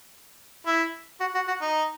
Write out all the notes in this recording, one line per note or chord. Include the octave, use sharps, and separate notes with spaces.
E4
F#4
F#4
F#4
D#4